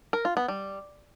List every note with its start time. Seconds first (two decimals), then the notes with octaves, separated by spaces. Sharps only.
0.13 A#4
0.25 F4
0.37 B3
0.48 G3